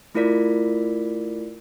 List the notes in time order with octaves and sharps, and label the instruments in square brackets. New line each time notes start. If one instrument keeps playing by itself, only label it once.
[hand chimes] A3 E4 F4 A#4 D5 B6